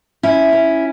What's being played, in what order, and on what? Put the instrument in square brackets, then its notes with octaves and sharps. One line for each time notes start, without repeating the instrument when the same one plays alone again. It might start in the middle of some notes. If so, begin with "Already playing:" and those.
[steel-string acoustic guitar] C#4 E4
C#4